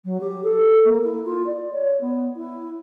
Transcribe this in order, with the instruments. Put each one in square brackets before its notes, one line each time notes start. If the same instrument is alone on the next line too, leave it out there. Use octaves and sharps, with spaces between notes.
[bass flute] F#3
G4
A4
A#3
E4
F4
D5
C#5
B3
E4